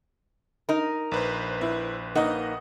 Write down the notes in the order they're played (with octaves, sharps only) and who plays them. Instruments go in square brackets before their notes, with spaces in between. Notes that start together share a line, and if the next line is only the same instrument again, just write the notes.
[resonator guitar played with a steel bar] D#4 A#4
[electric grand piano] A#1 B4 C5
[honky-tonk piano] E4
[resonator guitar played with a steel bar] A#3 D#4 [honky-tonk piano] D#5 F#5